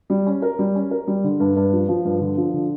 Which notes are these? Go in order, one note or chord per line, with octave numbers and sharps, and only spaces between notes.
G3
C#4
A#4
G3
C#4
A#4
G3
D3
G2
G2
F3
F3
G2
D3
F3
D3